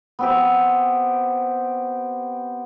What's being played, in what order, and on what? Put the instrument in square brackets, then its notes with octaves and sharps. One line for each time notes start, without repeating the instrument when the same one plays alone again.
[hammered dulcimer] B3 C4 G4